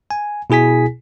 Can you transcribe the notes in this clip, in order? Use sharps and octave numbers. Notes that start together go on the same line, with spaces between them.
G#5
B2 E4 G#4 G#5 B6